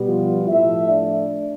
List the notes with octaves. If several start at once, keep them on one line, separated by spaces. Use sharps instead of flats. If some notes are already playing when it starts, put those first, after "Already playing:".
Already playing: B2 G3 B3
F3 F4
A2 F3 A3 E4 E5
D4 D5